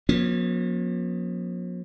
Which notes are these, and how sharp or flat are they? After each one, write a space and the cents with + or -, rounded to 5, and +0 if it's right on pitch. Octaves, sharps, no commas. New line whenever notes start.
F3 +45 A#3 +40 C#4 +0